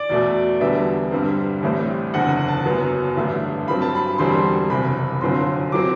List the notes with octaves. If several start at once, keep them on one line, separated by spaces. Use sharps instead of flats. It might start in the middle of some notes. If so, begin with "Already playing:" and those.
Already playing: D5
E2 B2 A3
E1 E2 D3 G3 B3 E5
G2 D3 G3 C4
A1 A2 G3 C4
F#1 E2 D3 F#5
A5
F#1 F#2 F#3 B3
A1 G2 D3 A3 D4
G2 F#3 C4 B5
A5
B5
E1 E2 D3 G3 C4 C6
F#1 E2 C3 B5
G1 F#2 D3 F#3 C4 C6
F#3 C4 D6